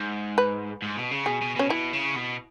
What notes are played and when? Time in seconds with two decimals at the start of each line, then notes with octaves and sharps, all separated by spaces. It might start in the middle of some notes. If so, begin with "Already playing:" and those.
Already playing: G#2
0.38 B4
0.82 G#2
0.97 B2
1.11 C#3
1.26 B2 G#4
1.41 B2
1.56 B2 C#4
1.70 B2 E4
1.93 C#3
2.15 B2